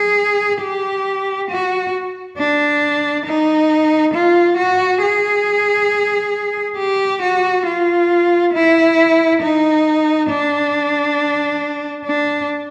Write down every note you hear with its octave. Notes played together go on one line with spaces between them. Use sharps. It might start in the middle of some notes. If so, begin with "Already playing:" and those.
Already playing: G#4
G4
F#4
D4
D#4
F4
F#4
G#4
G4
F#4
F4
E4
D#4
D4
D4